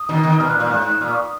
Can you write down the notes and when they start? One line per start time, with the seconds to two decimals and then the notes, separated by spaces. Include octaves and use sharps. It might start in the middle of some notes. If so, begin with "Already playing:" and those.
Already playing: D#6
0.09 B2 D#3
0.23 B2 D#3
0.40 B2 F6
0.49 A#2 F#6
0.60 A#2 F6
0.70 G#2 F#6
0.85 F#6
1.01 A#2 F6
1.10 C#6
1.16 D#6